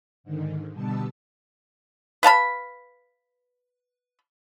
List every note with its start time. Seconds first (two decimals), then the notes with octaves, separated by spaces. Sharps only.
0.24 G#2 D3 D#3
0.72 B2 D3 G3 B3 A5 E6
2.23 B4 F5 A5 B5